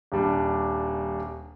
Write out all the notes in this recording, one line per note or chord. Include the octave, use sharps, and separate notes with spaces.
D#1 G3 D4